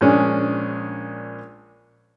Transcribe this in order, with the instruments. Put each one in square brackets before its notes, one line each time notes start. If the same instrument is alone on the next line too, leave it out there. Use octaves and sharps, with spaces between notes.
[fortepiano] A#1 G#3 C#4 D4